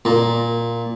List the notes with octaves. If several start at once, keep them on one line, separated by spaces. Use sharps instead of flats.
A#2